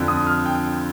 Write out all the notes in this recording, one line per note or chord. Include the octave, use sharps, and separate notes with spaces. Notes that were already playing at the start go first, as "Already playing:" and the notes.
Already playing: F2 D3 F3
D#6
F6
G5